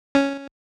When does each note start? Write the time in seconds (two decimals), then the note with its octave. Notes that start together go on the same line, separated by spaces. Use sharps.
0.15 C#4